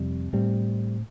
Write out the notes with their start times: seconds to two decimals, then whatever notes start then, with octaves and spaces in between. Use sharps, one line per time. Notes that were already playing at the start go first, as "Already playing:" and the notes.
Already playing: F2 C3 G3
0.33 A2 G3 C4